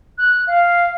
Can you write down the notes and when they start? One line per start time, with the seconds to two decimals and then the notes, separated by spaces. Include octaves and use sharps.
0.18 F#6
0.47 F5